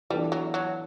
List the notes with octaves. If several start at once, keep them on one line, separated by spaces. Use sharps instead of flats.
E3 G3 B3 D4 A4
F#3
F#3